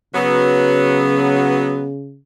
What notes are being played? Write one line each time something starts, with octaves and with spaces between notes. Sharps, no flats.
C#3 F#3 B3